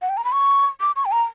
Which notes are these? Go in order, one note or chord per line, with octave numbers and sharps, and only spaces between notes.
F#5
G5
A#5
B5
C#6
D6
C#6
G5
A#5